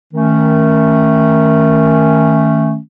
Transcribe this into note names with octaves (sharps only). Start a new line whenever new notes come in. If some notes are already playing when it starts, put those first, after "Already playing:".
D#3 A3 C#4